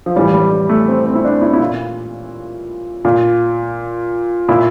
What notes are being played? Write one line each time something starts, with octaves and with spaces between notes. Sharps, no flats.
F3
A2 E3 G3
G3
G3
A3
C4
C4
E4
D4
E4
E4
A#2 F4
A#2
A#2 E4